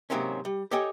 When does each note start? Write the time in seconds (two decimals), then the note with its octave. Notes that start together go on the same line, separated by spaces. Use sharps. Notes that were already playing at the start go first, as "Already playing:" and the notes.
0.10 G#2 C3 F#3 A#3 C4 C#4
0.45 G3
0.71 G4 A4 C#5 D#5 G5 G#5